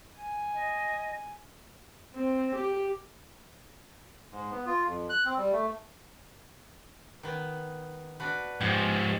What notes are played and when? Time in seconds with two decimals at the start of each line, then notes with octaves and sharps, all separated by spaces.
0.17 G#5
0.54 D#5
2.14 C4
2.56 G4
4.32 G#2
4.51 B3
4.66 F4
4.86 F2
5.09 F#6
5.25 C4
5.37 G3
5.52 A3
7.23 D#3 B3
8.20 D4 F#4 B4
8.61 G#2 F3 G4